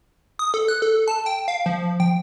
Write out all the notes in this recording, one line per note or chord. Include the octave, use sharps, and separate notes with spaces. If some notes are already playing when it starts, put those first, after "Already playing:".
D#6
A4
F#6
A4
A5
G5
F5
F3
G5